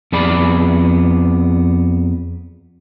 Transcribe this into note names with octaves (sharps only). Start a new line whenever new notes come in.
F2 B3 G#4 D5 B5